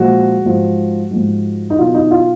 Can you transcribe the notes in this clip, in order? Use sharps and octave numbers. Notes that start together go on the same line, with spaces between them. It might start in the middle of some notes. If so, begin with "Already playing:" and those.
Already playing: A#2 F3 G#3 F#4
G#2 F3 G#3
G#2 F3 G#3
D#4
B2 F#3 F4
D#4
F4